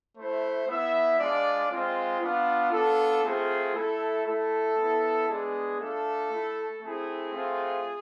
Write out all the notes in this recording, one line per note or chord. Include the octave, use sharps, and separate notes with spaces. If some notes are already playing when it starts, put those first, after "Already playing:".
A3 E4 C5
B3 E4 E5
G#3 D4 F4 D5
G#3 C4 F4
B3 D4 F4
B3 D4 F4 A4
A3 C4 F4 G#4
A3 E4 A4
A3 E4 A4
B3 E4
G#3 B3 D4 G#4
A3 D4 F4 A4
A3 E4
A3 C4 E4 G#4
A3 C4 F4